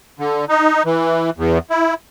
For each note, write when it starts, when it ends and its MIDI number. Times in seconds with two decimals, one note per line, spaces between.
0.19 0.45 50
0.49 0.83 63
0.86 1.30 52
1.38 1.58 40
1.70 1.94 64